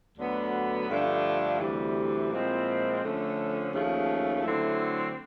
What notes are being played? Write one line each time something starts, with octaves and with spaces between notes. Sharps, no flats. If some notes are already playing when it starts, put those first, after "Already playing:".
D2 D3 F#3 B3
G2 D3 F3 A3 D4
D2 C3 E3 G3
A#2 F3 G#3 C4 E4
D3 F3 A3 C#4
D#2 C#3 F3 A3 C#4
D3 F#3 A3 C4 E4